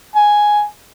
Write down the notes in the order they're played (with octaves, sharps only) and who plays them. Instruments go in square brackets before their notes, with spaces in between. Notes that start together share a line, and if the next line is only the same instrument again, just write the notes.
[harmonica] G#5